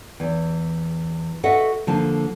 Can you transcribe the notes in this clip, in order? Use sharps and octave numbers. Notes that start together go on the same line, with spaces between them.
E2
F#4 A4 B4 D#5 E5 F#5
D3 F3 A#3 A5